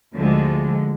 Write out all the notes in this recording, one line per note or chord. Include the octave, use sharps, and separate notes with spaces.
D2 D3 F3 G#3